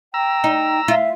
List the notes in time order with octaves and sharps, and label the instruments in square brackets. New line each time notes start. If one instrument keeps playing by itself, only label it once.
[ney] G5 [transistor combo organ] A#5 E6
[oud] D#4
[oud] F4 [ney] E5